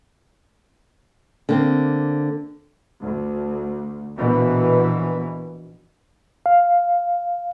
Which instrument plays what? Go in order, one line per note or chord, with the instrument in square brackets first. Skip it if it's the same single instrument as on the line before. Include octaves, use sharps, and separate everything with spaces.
[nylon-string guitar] D3 A#3 C4
[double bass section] D2
A#1 B2 E3
[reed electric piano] F5